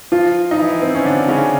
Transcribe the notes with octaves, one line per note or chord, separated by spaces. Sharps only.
F3 F4
D#4
E3 E4
C4
C#4
D3 D4
C#3 C#4